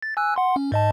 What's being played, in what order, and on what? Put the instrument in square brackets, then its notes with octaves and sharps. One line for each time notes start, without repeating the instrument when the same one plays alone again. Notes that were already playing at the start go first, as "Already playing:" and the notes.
[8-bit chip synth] A6
G#5 E6 F#6
F#5 C6
C#4
G#2 D#5 A5